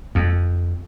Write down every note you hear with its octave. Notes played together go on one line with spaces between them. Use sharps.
F2